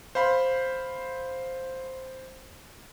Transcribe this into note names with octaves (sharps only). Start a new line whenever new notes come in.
C5 F5 B5 C6